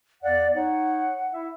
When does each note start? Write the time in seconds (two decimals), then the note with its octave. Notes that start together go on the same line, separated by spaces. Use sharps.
0.23 E2 D5 F5 F#5
0.55 D#4 C#5 F#5
1.34 E4 E5